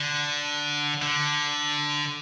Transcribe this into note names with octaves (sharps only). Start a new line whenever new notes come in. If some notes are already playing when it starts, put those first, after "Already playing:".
Already playing: D3
D3